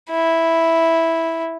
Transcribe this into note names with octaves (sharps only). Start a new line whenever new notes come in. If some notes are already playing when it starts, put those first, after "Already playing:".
E4